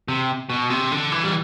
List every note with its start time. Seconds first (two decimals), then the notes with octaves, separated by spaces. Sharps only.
0.08 C3
0.50 B2
0.70 C3
0.91 D3
1.12 E3
1.24 G3